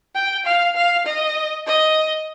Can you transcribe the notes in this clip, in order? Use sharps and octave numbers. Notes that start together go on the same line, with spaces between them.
G5
F5
F5
D#5
D#5